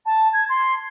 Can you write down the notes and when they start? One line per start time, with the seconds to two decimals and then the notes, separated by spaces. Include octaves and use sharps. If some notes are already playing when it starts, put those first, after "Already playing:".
0.05 A5
0.33 G#6
0.49 C6